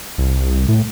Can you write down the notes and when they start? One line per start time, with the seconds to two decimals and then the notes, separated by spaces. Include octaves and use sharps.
0.18 C2
0.68 A2